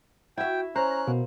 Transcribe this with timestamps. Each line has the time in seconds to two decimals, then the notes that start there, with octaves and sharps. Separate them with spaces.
0.38 E4 F#4 E5 G5
0.76 C#4 C5 A#5 F#6
1.07 B2 A#3